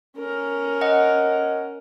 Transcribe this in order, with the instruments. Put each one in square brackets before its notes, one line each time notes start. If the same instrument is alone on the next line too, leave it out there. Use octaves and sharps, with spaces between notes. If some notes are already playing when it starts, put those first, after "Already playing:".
[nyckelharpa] C#4 A#4
[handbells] D#5 F#5